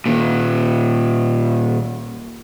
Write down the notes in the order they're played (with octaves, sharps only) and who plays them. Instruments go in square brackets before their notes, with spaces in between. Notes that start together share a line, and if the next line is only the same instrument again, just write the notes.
[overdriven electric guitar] A#2 D#3